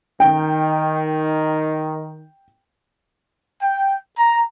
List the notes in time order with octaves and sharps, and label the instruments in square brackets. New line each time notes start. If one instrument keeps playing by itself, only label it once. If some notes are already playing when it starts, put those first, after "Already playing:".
[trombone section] D#3 [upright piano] G5
[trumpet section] G5
A#5